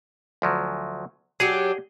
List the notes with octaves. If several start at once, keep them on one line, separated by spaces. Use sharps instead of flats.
D2 F3 F#3
F#3 D4 G4 G#4 F#5